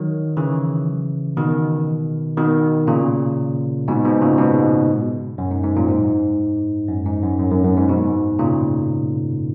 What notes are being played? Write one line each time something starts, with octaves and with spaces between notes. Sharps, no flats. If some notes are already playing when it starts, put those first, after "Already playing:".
Already playing: D#3 F#3
C#3 E3
B2 D#3
B2 D#3
A#2 C#3
G#2 B2
G#2 B2
A#2 C#3
G#2 B2
F#2
G#2
G#2
F#2 A#2
G#2
F#2
G#2
F#2
F#2
F#2
F#2
G#2
G#2 B2
A#2 C#3